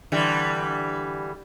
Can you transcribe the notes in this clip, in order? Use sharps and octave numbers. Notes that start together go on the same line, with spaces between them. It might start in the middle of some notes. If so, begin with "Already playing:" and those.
D3 E3 G3